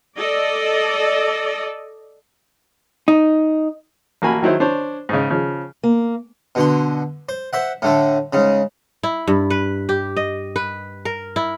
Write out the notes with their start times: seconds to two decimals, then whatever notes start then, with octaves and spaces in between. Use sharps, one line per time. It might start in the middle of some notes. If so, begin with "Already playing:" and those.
0.17 A4 D5 D#5
3.08 D#4
4.22 A1 A#3 F#4 G#5 B5
4.42 D#3 F#3 E4 C5
4.60 D4 C5 C#5
5.09 G#2 C#3
5.30 C#3 F3
5.83 A#3
6.55 B2 D3 C6
7.29 C5
7.53 C5 E5 F#5
7.82 A2 D3 A3
8.33 G#2 C#3
9.03 E4
9.27 G2
9.50 B4
9.89 G4
10.16 D#5
10.56 B4
11.05 A#4
11.36 E4